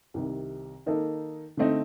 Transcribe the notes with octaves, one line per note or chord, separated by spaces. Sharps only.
C2 C3 D#3
D#3 A#3 D#4 A4 D#5
D3 A3 C4 D#4